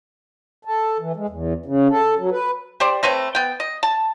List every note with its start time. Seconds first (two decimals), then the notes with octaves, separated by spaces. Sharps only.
0.65 A4
1.00 E3
1.16 G#3
1.29 E2
1.66 C#3
1.90 A4
2.19 F#3
2.31 B4
2.80 G4 C5 D5
3.03 A3 C4 B4 C#5
3.35 B3 G5
3.60 D#5
3.83 A5